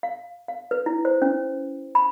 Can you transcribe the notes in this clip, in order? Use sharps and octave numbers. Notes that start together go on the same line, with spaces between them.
F5
F5
B4
E4
C5
C#4
B5